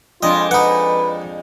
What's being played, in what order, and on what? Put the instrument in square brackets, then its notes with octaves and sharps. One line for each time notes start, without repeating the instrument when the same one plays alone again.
[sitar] F2 G#3 D4 [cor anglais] F4 [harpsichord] D#5
[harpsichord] D#4 F#5 [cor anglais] B4